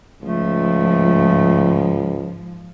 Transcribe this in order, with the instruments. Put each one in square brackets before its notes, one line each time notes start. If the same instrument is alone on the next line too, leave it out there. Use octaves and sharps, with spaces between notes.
[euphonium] C#2 [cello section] G#2 F3 [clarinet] A3